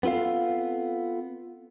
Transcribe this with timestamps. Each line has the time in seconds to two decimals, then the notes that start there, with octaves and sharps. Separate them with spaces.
0.03 B3 C4 F4 A4 F5